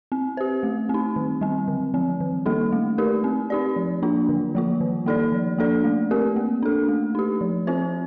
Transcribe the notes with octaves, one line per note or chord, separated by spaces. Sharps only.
C4
G4 C5
A3
C4 D#4
D#3
G3 C4
D3
F3 C4
D#3
G3 A#3 D#4 A4
A3
D#4 G4 A#4
C4
D#4 G4 D5
F3
A#3 D4 F4
D3
F3 A#3 F4
D#3
A#3 D#4 A4 D5
F3
A#3 D4 A4 D5
A3
C4 G4 A#4
A#3
D4 A4
A3
D#4 G4
F3
C4 F4 C5